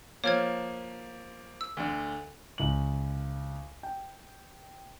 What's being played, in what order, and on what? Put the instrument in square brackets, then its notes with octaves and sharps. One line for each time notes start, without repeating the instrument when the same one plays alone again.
[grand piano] F3 A#3 [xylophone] C#5 F6 G#6
[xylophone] E6
[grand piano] D2 D3
C#2 F#7
G5